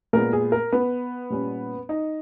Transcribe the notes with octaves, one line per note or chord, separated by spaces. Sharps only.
A#2 G#3 B3 A#4
G#4
A#4
B3 B4
A#2 G3 C#4
D#4 D#5